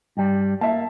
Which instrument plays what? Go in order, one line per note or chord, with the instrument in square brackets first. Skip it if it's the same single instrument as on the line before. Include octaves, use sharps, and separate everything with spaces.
[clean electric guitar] G2 G3
[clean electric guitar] A#3 [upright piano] E5 A5